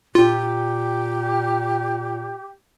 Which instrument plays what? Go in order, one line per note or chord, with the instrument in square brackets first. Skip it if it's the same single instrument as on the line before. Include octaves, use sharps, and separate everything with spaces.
[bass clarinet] A#2 [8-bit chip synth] F4 [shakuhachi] G4